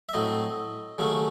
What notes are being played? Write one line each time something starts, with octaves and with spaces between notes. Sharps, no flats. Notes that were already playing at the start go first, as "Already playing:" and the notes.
E5
A2 F#3 C4 D#5
D#2 C#3 F#3 A3 C#4